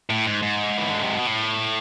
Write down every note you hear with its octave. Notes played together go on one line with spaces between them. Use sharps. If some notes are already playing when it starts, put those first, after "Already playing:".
A2
G#2
G#2
E3
D3
C3
B2
A2